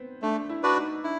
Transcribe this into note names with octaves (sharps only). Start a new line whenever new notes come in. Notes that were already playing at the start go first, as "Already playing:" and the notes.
Already playing: B3 C4
A3 D4
E4
D4 F#4 B4 D5
D#4
D4 E4